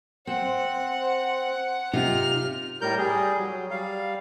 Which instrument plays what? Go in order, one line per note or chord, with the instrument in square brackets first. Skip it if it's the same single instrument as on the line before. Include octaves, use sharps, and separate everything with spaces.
[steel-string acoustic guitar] C4 [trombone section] C5 [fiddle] F#5
[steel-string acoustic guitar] C3 D#4 F4 [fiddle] F6
[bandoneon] A2 G3 A#4 G6
G3 G#4
F#3
G3 F5